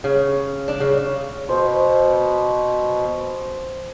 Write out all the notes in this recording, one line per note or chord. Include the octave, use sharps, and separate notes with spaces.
C#3
D4
C#3
B2 C5